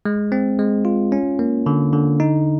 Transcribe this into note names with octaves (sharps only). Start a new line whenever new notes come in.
G#3
C4
G#3
F4
C#4
A#3
D3
D3
D#4